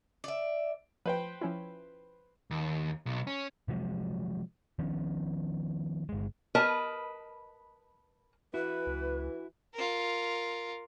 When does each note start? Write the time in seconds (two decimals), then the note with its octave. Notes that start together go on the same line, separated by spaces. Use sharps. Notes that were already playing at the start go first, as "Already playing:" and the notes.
0.24 D5 E5
1.06 F3 B4 C5 G5
1.41 F3 C#4 E4
2.51 D#2
3.06 B1
3.27 C#4
3.68 C3 F3 F#3 G#3
4.79 D#3 F3 B3 C#4
6.09 G1 G#3
6.55 A#4 B4 D#5 A5
8.54 E3 E4 F#4 B4
8.87 C#2
9.74 F4 A#4